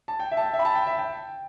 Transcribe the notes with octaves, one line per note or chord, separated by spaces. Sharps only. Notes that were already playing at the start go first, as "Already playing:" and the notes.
A5
G5
E5
A5
G5
E5
B5
A5
G5
E5
G5